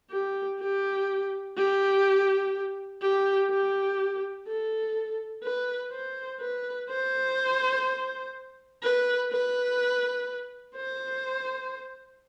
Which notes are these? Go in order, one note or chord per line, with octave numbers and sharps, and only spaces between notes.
G4
G4
G4
G4
G4
A4
B4
C5
B4
C5
B4
B4
C5